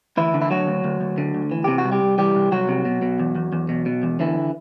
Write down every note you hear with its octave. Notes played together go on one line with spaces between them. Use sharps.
D2 E3 E4
D3
E4
D2 F#3 F#4
D2
D2
D2
D3
D2
E3
C3 G4
F#4
C2
G3 G4
C2
E3 G3 G4
C2
C2 F#3 F#4
C3
B2
B2
E2
E2
E2
B2
B2
E2
D3 E3 E4